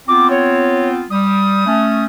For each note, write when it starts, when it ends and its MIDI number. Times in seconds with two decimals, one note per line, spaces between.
0.08 1.03 59
0.08 1.03 60
0.08 1.03 65
0.08 0.30 86
0.30 0.88 73
1.10 1.63 55
1.10 2.04 87
1.66 2.06 57
1.66 2.06 61